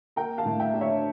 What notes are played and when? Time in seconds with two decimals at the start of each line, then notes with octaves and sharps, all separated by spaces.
0.16 A#3 G5 A#5
0.38 F5 A5
0.45 A2
0.60 E5 G5
0.74 D4
0.81 C#5 E5